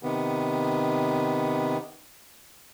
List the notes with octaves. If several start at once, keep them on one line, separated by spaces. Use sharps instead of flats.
C3 D#3 B3